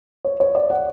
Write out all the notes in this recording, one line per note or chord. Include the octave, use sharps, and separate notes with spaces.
C#5
C#5
D5
F#5